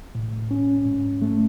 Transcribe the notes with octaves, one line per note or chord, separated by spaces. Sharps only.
A2
C#4
G#2
A3